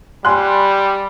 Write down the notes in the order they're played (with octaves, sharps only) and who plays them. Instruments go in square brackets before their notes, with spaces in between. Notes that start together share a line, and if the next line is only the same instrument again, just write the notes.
[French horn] G3 [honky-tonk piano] G#5 C6 F#6